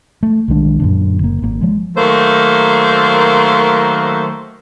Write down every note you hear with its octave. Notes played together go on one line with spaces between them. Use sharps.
A3
B1 D#3 G#3 D4
F#2 A#2 D3
F#1 A#3
G#1 A#3
F3 G#3
D#3 F#3 A3 A#3 C5